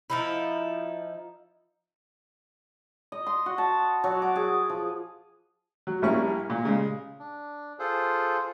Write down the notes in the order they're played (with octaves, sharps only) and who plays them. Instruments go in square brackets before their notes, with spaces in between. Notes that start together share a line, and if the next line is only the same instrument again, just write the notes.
[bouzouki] F3 D#4 E4
[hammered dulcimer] D#5
C6
F#4
A5
F#3
D6
G#4
F3
[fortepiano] F#3
A#1 G3 A#3 C#4 E4 C#6
A#2
C#3 G#3
[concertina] D4
F4 G#4 A4 C5